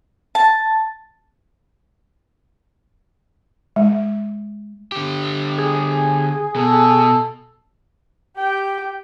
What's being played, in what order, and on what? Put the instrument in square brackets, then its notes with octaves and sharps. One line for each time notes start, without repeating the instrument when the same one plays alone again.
[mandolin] A5
[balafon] G#3
[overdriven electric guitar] D3 G4
[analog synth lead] G#4
[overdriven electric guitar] B2 [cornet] A4
[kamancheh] G4 G5